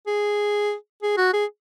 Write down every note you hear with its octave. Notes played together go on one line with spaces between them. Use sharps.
G#4
G#4
F#4
G#4